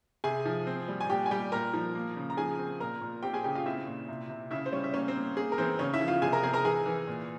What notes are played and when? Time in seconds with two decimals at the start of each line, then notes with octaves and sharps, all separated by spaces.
0.24 C3 G#4 G#5
0.45 F3
0.67 C4
0.88 G3
1.01 G#5
1.10 A#2 G4 G5
1.26 G#5
1.31 G3 G4 G5
1.52 A#2 A#4 A#5
1.73 F3
1.95 A#3
2.16 C#3
2.30 A#5
2.37 F3 G#4 G#5
2.59 C4
2.80 A#2 A#4 A#5
3.01 A#2
3.23 C4 G4 G5
3.34 G#4 G#5
3.44 C#3 G4 G5
3.55 F4 F5
3.66 C4 E4 E5
3.87 A#2
4.09 C3
4.30 C3
4.51 C#3 E4 E5
4.66 C5
4.72 G3 C#4 C#5
4.84 E5
4.94 A#3 C#4 C#5
5.08 C4 C5
5.15 A#3
5.36 A#3 G#4
5.52 A#4
5.58 E3 C4 C5
5.79 C#3 C#4 C#5
5.93 E4 E5
6.01 F3
6.07 F4 F5
6.22 C3 G#4 G#5
6.32 A#4 A#5
6.43 C4 G#4 G#5
6.54 A#4 A#5
6.65 E3 G#4 G#5
6.86 E3
7.07 A#2